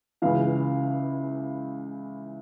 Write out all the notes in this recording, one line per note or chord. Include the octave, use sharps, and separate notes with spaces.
C#2 C#3 E3 F5